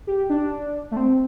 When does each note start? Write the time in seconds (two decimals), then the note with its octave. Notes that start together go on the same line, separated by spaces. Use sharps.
0.07 G4
0.30 D4
0.91 A3
0.97 C4